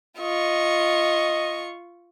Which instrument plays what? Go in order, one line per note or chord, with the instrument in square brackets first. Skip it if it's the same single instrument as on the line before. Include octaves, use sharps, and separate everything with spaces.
[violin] F4 C#6 [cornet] D#5